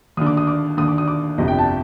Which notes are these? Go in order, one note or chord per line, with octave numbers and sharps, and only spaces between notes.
D#2 D3 D#6
D6
D#6
D6
D#2 D3 D#6
D6
D#6
D6
G1 F2 C3 D#5
G5
A5